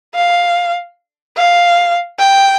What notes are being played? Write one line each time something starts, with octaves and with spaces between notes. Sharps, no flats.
F5
F5
G5